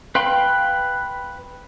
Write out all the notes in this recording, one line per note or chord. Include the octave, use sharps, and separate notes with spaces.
B4 F5 G5 B5 C6